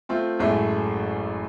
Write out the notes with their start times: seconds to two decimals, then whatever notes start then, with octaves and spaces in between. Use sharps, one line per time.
0.09 A3 C4 F4
0.39 A1 F#2 G#3 A3 E4